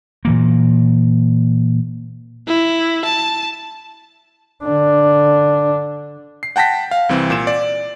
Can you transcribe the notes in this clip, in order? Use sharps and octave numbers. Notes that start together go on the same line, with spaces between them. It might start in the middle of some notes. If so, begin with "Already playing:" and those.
A#2 E3 A#3
E4
A5
D3 D4
C7
F#5 G5 A5 A#6 B6
F5
C2 E3 C4
A#2 E7
D5